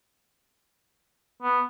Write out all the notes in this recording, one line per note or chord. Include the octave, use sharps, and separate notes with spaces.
B3